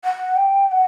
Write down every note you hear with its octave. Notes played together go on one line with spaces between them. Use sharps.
F#5
G5
G5
F#5